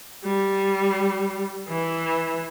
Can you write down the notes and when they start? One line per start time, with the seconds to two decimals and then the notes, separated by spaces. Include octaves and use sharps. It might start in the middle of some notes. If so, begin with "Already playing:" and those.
0.25 G3
1.69 E3